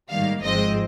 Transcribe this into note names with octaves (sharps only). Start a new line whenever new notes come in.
G#2 D#3 G3 A#3 F5
G#1 G#2 F3 G#3 C4 D#5